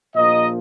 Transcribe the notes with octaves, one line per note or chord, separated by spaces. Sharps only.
A#1 A#2 F3 A#4 D#5